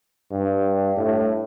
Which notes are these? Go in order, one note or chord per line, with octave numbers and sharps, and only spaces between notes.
G2
A2